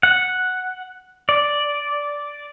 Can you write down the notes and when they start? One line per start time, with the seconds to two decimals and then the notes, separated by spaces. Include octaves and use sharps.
0.03 F#5
1.29 D5